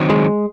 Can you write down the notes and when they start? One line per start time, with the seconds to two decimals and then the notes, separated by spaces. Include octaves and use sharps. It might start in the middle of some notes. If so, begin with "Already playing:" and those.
Already playing: D#3 F#3 C4
0.10 G#3